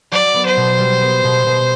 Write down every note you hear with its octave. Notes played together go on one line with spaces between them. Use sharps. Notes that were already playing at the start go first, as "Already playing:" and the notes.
F#3 D5
B3
C5
B2
G3
B3
B2
B2